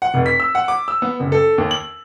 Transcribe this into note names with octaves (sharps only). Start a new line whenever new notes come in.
F#5
F1
B6
E6
F#5
D6
E6
B3
F#1
A4
D#2
F#7